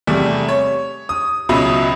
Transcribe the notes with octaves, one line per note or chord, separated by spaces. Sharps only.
E2 C3 G3 A3
C#5
D#6
C#2 B2 F#3 E5 B5 D#6